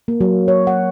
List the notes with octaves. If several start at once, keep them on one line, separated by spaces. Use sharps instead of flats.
A#3
F#3
C#5
F#5